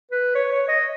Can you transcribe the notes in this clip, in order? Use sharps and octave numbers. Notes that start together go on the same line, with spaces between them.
B4
C#5
C#5
D#5